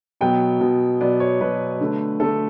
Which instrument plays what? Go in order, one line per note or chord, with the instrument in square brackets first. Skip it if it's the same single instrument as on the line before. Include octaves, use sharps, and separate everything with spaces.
[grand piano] B2 F#3 B3 G5
B2 F#3 B3
B2 F#3 B3 D5
C#5
B2 F#3 B3 B4
D3 A3
D3 A3 A4